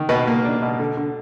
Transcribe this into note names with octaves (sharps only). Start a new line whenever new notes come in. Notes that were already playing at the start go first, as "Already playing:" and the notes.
Already playing: D#3
B2 B4 D#5
A#3
D4
B2
D3
D3